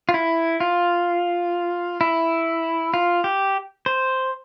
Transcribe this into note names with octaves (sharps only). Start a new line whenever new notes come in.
F4
E4
F4
E4
F4
G4
C5